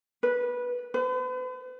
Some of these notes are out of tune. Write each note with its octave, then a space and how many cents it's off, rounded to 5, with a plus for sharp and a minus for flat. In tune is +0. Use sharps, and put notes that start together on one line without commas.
B4 -15
B4 +45